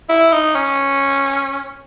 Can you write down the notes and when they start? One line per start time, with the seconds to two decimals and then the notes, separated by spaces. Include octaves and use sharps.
0.09 E4
0.32 D#4
0.55 C#4